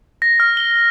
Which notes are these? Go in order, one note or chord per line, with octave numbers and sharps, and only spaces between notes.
A#6
F6
G7